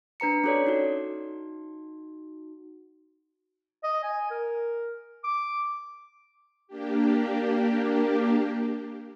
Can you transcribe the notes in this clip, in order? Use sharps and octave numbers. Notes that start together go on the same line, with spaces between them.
D4 B4 A#5 C#7
C#4 F#4 A4 C#5 D5
D#4 F#4
D#5
G#5
A#4
D6
A#3 D4 G4